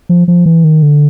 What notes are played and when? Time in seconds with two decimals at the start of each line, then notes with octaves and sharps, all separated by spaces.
0.09 F3
0.28 F3
0.46 E3
0.64 D#3
0.82 D3